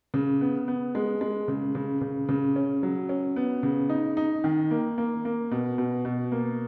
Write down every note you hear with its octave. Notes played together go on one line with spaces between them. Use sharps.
C#3
B3
B3
G#3
G#3
C#3
C#3
C#3
C#3
C#4
F#3
C#4
B3
C#3
D#4
D#4
D#3
A#3
A#3
A#3
B2
B2
B2
A#3